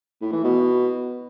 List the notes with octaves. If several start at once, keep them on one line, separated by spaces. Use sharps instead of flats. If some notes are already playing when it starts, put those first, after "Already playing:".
A2
E3
B2